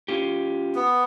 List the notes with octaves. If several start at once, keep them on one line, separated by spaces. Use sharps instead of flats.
C#4 F4 G4
B3